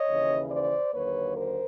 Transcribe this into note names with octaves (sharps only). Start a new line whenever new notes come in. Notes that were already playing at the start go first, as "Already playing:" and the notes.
Already playing: C#5 D#5
D#2 C#3 E3
C5 D5
D#2 D3 F#3 A#3 B4 C#5
A#4 C5